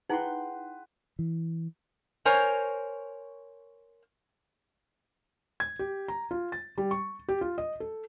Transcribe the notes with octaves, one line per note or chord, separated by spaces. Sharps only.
D#4 E4 G#4 B4 F#5 G5 C6
E3
A#4 C5 C#5 G#5
G#6
G4
A#5
F4
A6
G3
C#6
G4
F4
D#5
A4